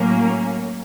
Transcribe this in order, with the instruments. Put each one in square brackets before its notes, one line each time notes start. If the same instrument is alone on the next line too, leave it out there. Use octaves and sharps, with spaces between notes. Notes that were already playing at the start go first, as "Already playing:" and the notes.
Already playing: [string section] A2 F#3 A#3 C#4